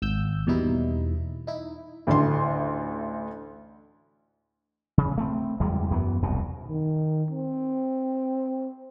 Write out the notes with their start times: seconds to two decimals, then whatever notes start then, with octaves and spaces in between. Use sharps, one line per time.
0.02 G#1 E6 G6
0.47 E2 B2 G3 A#3 D#4 E4
1.47 D#4 E4
2.07 A1 D2 D3 D4 C6
4.98 C#3
5.18 A3 C4
5.60 F#1 E2 G3 G#3
5.91 F#2 E3 G#3 B3
6.22 E1 C2 F#2 B2
6.68 D#3
7.31 C4